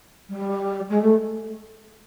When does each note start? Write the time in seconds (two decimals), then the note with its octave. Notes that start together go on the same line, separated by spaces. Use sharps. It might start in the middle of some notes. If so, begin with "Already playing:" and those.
0.29 G3
0.89 G#3
1.01 A3